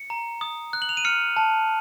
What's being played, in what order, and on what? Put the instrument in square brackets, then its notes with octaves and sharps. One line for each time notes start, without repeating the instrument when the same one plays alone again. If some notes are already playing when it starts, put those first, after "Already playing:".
Already playing: [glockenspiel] C#7
A#5
D#6
F#6
F#7
F7
D#7
F6 C#7
A5